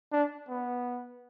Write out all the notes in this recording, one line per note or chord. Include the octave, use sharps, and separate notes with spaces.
D4
B3